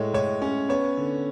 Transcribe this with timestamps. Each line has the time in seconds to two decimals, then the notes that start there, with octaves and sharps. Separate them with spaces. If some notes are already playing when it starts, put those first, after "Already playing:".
Already playing: A2 G#3 C#5
0.14 A2 C#5
0.42 C#4
0.69 B3 C#5
0.97 D3